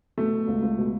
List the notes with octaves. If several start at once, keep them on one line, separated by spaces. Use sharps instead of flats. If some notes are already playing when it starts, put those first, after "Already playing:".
B2 A3
B2
C#2
C#2
B2